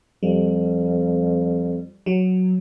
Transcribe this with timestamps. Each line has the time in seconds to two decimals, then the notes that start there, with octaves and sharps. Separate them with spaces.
0.23 F2 G3
2.06 F#3